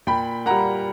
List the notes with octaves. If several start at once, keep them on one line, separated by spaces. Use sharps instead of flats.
A#2 G5 B5
G3 A#3 F#5 A#5